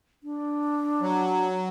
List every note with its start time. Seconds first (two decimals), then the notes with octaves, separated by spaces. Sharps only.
0.23 D4
1.01 F#3